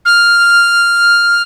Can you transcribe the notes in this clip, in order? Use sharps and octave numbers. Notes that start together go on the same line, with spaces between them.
F6